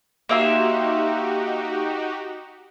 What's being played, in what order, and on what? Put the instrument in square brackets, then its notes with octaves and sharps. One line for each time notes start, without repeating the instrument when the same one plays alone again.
[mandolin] A#3 E5 C6 [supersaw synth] D#4 F#4 G4